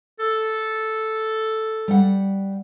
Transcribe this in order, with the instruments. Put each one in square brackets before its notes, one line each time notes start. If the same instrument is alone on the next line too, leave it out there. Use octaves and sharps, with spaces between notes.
[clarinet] A4
[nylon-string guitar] G3 F#5